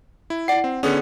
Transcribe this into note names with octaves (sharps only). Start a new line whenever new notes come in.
E4
E4 D5 F#5 C7
C4
D3 B3 C#4 G#4 D5 D#6